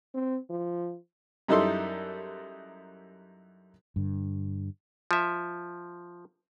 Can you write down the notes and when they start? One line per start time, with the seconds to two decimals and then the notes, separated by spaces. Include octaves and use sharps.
0.14 C4
0.50 F3
1.48 F#2 G3 D#4 E4 A4 C6
3.96 G2 D3
5.11 F3 E5